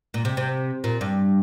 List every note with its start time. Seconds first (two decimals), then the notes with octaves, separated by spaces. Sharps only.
0.14 A#2
0.25 C3
0.37 C3
0.84 A#2
1.01 G2